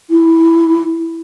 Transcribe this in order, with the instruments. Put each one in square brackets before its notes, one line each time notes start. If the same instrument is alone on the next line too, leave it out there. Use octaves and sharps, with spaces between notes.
[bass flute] E4